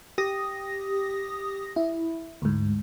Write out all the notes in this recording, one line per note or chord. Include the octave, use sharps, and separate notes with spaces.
G4 D#6 A#6
E4
D2 G#2